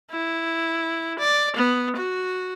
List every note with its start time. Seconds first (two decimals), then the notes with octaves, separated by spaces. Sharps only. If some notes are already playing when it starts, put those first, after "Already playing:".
0.11 E4
1.19 D5
1.57 B3
1.96 F#4